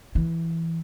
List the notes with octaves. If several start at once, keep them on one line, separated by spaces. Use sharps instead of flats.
E3